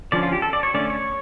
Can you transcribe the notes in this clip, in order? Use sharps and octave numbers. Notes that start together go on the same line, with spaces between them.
D3 F3 C#4 D5
F4
G4
A4
D5
C#5
D3 A3 C#4 D5
C#5